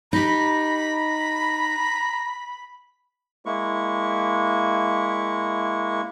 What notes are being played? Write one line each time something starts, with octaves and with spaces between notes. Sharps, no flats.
D#4 G4 A#5 B5
G#3 A#3 E4 C#6